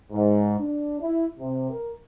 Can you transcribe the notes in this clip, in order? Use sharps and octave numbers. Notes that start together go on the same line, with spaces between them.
G#2
D4
E4
C3
A#4